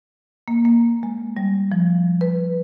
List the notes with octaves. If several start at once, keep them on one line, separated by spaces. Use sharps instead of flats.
A#3
A#3
G#3
G3
F3
B4